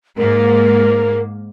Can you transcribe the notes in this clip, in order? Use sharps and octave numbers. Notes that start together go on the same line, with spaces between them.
G#2 A#3 A#4